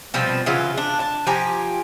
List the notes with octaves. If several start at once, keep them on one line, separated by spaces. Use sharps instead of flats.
B2 F3 G3 C4
C#3 E3 F#3 F4
D4
A5
F3 G4 G#5 A#5